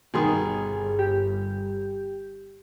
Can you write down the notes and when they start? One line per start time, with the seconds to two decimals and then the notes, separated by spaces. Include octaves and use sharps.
0.14 G1 G2 B2 D#3 G#4 G#5 C6 D#6
0.99 G4